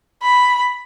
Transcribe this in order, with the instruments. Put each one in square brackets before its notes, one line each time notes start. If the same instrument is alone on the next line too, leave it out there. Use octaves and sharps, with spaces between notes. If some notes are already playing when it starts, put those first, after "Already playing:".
[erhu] B5